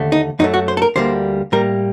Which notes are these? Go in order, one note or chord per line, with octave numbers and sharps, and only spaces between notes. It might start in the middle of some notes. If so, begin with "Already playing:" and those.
Already playing: D#2 D3 A3
D#4
F#2 F#3 A3 D#4
F#4
C5
A4
A#4
D2 D3 G3 A#3 C5
A2 G3 A#3 A#4